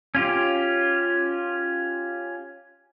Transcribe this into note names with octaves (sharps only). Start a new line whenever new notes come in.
C#4 F4 G4